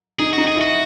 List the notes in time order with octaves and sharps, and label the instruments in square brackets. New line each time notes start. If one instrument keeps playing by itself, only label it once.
[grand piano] D#4 [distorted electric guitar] G#4
[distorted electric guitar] F#4
[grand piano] D#4
[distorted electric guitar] G#4
[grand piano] E4 [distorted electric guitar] F#4